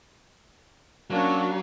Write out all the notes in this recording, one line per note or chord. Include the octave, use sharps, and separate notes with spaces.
F#3 A#3 C#4 D4 C#5